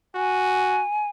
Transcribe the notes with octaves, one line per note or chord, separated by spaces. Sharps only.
F#4 G#5